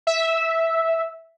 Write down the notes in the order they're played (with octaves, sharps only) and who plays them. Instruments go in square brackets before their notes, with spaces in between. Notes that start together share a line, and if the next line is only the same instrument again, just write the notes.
[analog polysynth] E5